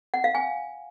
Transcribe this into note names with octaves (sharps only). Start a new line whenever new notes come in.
F#5
F5
G#5